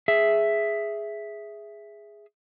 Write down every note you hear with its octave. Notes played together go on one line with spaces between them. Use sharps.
G#4 E5